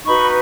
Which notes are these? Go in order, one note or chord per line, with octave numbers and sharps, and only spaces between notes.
D#4 F#4 B4 B5 C#6